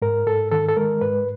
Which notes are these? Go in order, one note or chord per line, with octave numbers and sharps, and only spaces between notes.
G#2 A#4
G#2 A4
D#3 A4
A4
G#3 A#4
G#2 B4